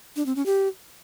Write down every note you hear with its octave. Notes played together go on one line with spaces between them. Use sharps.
D4
C4
C#4
G4